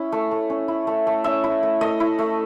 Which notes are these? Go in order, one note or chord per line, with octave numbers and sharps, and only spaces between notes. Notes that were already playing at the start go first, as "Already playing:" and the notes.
Already playing: C#4 E4
A3
A3
C#4
E4
A3
A3
C#4 E5
E4
A3
A3 D#5
E4
A3